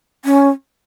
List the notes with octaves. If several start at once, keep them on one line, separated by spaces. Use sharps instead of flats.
C#4